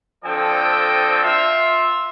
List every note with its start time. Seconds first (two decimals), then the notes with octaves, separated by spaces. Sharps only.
0.25 D3 F3 C4 A4 D#5 G5
1.23 F4 E5 F5